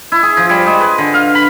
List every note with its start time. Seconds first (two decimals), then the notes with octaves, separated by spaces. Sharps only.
0.12 E4
0.23 G#4
0.37 F3
0.49 G3
0.67 G#3
0.81 B4
0.98 D3
1.14 F5
1.35 B5